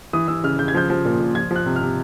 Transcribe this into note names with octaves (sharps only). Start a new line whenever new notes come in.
E3 D#6
E3 E6
C#3 F6
C#3 G6
G#6
F3 G6
F3
A#2
A#2
F3 G#6
F3
F#6
C3
F6
C3